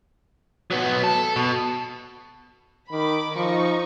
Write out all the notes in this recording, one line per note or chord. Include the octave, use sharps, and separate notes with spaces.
F#3 B3
A4
B2
D#3 B5 D6
F3 D#4 C#6